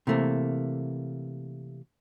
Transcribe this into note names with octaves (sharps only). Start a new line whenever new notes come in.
C3 E3 A3 A#3